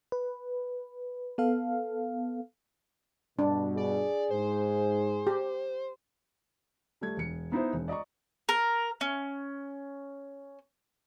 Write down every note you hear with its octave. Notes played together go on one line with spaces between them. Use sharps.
B4
B3 A4 F5
G2 B2 D4
G#4 D5
G#2 C5
G4
G3 A3 G#6
E1 C#7
B3 D#4 E4 C5
E1
D5 D#5 A#5 C#6
A#4
C#4